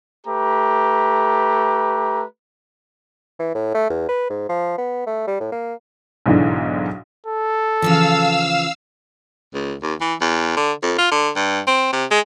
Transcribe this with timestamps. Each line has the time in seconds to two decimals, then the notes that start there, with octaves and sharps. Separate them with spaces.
0.27 A3 G4 B4 A#5
3.39 E3
3.55 A2
3.74 A3
3.90 E2
4.09 B4
4.30 G#2
4.49 F3
4.78 B3
5.07 A3
5.27 G3
5.40 A2
5.52 A#3
6.26 B1 G#2 D3 E3 D4
7.26 A4
7.82 C#3 E3 F3 F5 E6
9.54 C#2
9.83 D#2
10.01 E3
10.21 E2
10.57 D3
10.83 F2
10.99 F4
11.12 D3
11.36 G2
11.67 C4
11.93 C3
12.11 G#3